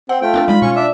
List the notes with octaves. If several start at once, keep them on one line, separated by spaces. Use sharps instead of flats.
C4 F#5
A3 F4 G5
C4 D4 A4
G3 G#3 D#4 B5
B2 C#4 C#6
D4 E5